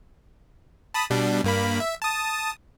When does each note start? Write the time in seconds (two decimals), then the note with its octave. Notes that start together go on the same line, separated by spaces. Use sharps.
0.94 A5 B5 D#6
1.10 B2 G3 D4
1.44 G2 A#3 B5
1.80 E5
2.02 A5 D#6